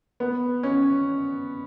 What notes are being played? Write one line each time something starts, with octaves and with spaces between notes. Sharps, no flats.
B3
C#4